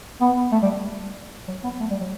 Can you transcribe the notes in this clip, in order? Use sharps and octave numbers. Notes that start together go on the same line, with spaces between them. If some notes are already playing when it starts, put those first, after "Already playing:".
B3
A3
G3
F#3
B3
A3
G3
F#3